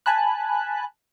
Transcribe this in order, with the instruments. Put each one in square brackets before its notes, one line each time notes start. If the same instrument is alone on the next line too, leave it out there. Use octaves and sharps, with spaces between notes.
[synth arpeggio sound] G#5 A5 B5 F#6